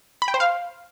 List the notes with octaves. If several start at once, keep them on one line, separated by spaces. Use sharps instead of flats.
B5
G5
C5
F5